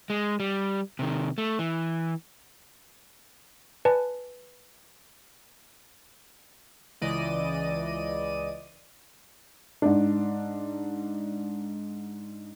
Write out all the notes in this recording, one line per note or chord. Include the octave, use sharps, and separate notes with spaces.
G#3
G3
C3 D#3
A3
E3
B4 D5 G#5 A5
C#2 E3 D5 D#5 D#7
G#2 D4